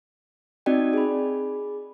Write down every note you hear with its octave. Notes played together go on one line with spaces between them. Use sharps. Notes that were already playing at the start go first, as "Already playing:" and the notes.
C4 D#4 F#4 D5 D#5 G5
G#4 B5